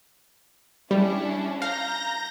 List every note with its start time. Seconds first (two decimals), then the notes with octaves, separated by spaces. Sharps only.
0.91 G3 C#4 D4 E4
1.62 F5 A#5 G6 A#6